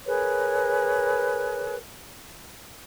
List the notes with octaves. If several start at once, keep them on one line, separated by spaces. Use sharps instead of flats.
G#4 A#4 B4 C#5